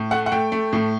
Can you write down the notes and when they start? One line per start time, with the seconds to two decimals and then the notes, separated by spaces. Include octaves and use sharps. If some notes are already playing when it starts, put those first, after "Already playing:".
Already playing: A2
0.11 A3 F#5
0.26 F#5
0.32 A3 G5
0.52 A3
0.73 A2